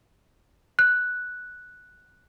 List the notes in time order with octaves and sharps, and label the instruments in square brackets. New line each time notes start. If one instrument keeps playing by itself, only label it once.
[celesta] F#6